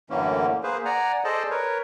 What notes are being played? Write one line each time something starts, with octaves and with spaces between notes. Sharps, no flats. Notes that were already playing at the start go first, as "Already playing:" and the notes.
F#2 A2 D3 E3 A#3 C#4
A#3 G#4 B4 C5
D5 F#5 G#5 A#5
G#4 A4 C5 D5 D#5 A5
A#4 B4 C#5